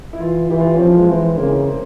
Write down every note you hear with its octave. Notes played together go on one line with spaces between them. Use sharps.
E4
E3 F4
E3 G4
F4
C#4
F3 C4
G#3
E3 C4
C#3 A#3
C4